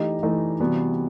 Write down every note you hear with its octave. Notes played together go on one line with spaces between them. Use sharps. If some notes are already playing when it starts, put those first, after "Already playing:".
Already playing: E3 A3 D#4 G4 D#5
E3 A3 D#4 G4 D#5
C3 E3 G3 B3 F#4